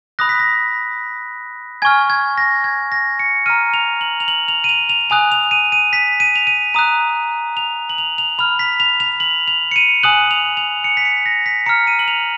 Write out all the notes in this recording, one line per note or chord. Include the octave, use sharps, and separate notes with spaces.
B5 D#6 F#6 A#6
B6
A#6
G#5 C#6 F6 G#6
G#6
A#6
G#6
A#6
C#7
A#5 F6 D#7
F7
F#7
F7
F#7
F7
D#7
F7
F7
G#5 D#6 F#6 F7
F7
D#7
D#7
B6
D#7
F7
D#7
A#5 D#6 F#6 D#7
F7
F#7
F7
F7
B5 F6 F7
B6
F7
F7
F#7
F7
C#7
D#7
G#5 D#6 F#6 F#7
F7
F7
C#7
B6
C#7
A#6
B6
A#5 F6 C#7
D#7
F#7
F7